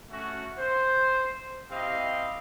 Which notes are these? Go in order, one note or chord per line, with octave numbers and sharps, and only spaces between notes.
A3 C#4 F#4
C5
C4 E4 G4 D#5 F5